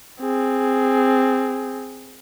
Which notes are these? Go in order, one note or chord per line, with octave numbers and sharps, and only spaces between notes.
C4 G#4